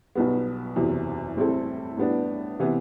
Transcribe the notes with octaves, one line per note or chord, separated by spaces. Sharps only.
B1 B2 G3 B3
F#1 E2 C3 F#3
A2 G3 C4 E4 A4
A2 G3 B3 D4
C3 E3 B3